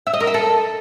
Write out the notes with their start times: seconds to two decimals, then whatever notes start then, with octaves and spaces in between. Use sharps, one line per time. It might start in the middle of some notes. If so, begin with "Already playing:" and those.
0.07 E5
0.14 D#5
0.20 A#4
0.27 E5
0.34 A4